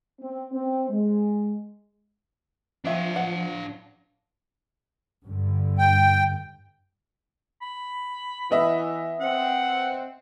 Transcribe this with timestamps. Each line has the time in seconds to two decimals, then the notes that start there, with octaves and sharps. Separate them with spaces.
0.20 C4
0.51 C4
0.90 G#3
2.85 F3 B3 C4 D4 E5 F5
3.16 B4 F#5
5.25 G2 D3
5.78 G5
7.62 B5
8.51 E3 B3 D#5 E5
9.20 C4 F#5